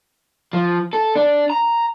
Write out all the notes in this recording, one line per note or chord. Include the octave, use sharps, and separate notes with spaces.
F3
A4
D4
A#5